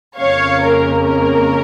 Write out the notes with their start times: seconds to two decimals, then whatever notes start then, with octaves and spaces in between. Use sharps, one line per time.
0.17 F2 C#3 A#3 C#4 C#5 F5
0.62 A#4
1.07 A#4